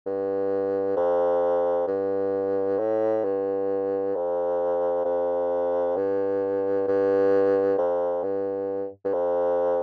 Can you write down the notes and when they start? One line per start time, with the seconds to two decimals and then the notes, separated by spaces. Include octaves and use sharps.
0.06 G2
0.97 F2
1.87 G2
2.79 A2
3.24 G2
4.15 F2
5.05 F2
5.96 G2
6.87 G2
7.78 F2
8.23 G2
9.04 G2
9.13 F2